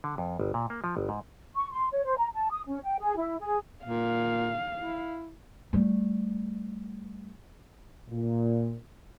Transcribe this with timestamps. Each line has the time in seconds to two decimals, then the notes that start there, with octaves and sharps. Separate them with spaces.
0.04 D3
0.18 F2
0.40 G1
0.54 A#2
0.70 A#3
0.84 F3
0.97 G1
1.09 G#2
1.56 C#6
1.71 C6
1.92 C#5
2.04 C5
2.17 A#5
2.35 A5
2.50 D#6
2.68 C#4
2.84 G5
2.99 G#4
3.17 E4
3.40 G#4
3.85 A#2 F5
4.77 E4
5.73 G3 A3
8.10 A#2